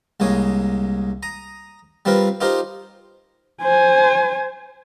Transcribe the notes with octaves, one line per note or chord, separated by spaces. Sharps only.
C2 G#3 A#3 C#5 D#6
A#5 D#6
G3 C4 F4 A#4 B4
D#4 F4 G4 A#4 C5
C5 G#5